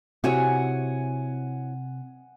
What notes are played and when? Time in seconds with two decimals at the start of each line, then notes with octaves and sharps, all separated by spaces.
0.24 C3 E4 F#4 C#5 F#5 G#5